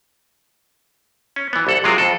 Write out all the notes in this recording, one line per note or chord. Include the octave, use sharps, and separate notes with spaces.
C#4
E3 B3
C2 A4 F#5
C3 F#3 G#3 F4 G#4 A#4
F2 A4